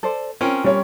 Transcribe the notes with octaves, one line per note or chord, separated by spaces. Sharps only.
A4 C5 D5
C4 C#4 F4 A#4 G5 G#5
G3 C#5